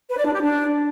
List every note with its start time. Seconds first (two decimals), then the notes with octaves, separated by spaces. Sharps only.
0.09 B4
0.17 D5
0.25 D4
0.34 G4
0.42 D4